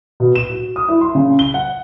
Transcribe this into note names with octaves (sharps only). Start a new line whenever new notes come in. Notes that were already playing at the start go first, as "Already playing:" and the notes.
B2
E7
F#4
D#6
E4
C6
C#3
G7
F#5